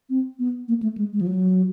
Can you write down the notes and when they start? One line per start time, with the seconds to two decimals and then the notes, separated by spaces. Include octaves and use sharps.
0.10 C4
0.39 B3
0.68 A#3
0.83 A3
0.98 G#3
1.13 G#3
1.21 F3
1.27 F#3